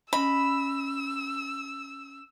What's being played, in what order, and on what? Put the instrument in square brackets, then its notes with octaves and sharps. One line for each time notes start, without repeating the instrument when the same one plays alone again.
[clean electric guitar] C#4 D#5 [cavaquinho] B5 [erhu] E6